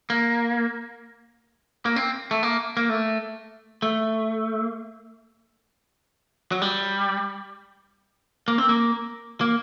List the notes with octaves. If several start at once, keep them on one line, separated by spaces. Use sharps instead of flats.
A#3
A#3
C4
A3
A#3
A#3
A3
A3
F#3
G3
A#3
C4
A#3
A#3